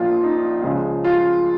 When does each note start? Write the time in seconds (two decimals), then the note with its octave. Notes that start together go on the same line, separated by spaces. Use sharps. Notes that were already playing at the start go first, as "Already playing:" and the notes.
Already playing: A#1 A#2 F3 F4
0.22 D#4
0.63 C#2 C#3 F3 G#4
1.04 F4